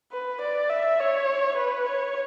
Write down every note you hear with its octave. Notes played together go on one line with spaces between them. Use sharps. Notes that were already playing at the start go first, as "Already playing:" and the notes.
B4
D5
E5
C#5
B4
C#5